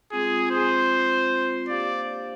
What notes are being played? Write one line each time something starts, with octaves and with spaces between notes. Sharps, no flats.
G#3 C4 F4 G#4
C5
A#3 D4 G4 C5 D5 F5